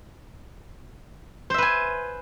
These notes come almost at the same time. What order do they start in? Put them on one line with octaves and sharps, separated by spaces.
C5 E5 B4 G#5